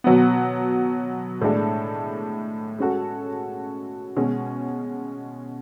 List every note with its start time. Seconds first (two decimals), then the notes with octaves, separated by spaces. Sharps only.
0.04 B2 F#3 B3
1.41 A2 G#3 D4 A4
2.78 G#3 C#4 F#4 A4
4.16 B2 G#3 C#4